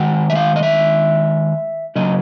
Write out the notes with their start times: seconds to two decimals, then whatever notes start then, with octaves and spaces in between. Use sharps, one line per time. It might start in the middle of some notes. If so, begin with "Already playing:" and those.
Already playing: D#3 G#3 F#5
0.30 E5
0.35 F5
0.56 D#5
0.63 E5
1.96 C#3 F#3 A#3 D#5